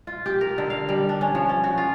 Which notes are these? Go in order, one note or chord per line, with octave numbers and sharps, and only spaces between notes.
F4
G4
A#4
D3
F5
G3
D4
C#4
F3
C#4
F#4
F4